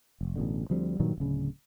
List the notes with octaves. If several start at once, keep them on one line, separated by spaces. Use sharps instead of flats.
F1
A1 B2 D3
D2 F3 G3 C4
G2 A#2 D#3 F#3
D1 C#3